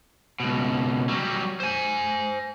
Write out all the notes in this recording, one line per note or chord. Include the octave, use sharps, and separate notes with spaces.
C#2 B2
F#3 G3
C5 G#5